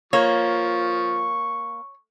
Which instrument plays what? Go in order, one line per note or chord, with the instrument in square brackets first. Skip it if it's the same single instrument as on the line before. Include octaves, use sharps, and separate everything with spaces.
[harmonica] F3 [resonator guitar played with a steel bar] A#3 [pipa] C#5 [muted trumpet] C#6